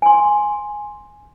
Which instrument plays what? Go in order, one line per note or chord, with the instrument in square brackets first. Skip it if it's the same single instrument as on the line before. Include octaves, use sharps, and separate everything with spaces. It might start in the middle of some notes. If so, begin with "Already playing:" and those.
[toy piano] G#5 C6